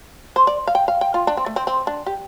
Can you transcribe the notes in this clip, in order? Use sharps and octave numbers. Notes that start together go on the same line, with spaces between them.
C5
D5
F5
G5
F5
G5
F4
D4
C4
A3
C4
C4
D4
G4